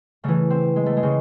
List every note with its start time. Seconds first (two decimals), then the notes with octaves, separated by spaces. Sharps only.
0.24 C#3 E3 A3
0.50 C4
0.76 G#3
0.86 A3
0.97 G#3
1.03 C#3